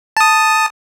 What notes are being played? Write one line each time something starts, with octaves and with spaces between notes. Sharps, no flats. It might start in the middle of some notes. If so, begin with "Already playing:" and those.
A5 D#6